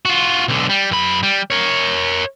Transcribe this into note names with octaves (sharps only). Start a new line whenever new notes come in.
F4 F#4
B1 D3
G3
F#2 B5
G3
A#4 C#5